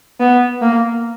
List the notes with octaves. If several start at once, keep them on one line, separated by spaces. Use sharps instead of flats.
B3
A#3